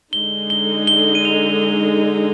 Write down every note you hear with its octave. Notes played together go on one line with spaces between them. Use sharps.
D3 G#3 D#4 G7
G7
G7
D#7
F7
G7